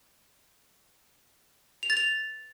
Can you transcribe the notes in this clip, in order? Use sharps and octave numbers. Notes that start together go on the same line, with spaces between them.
F7
A6
F7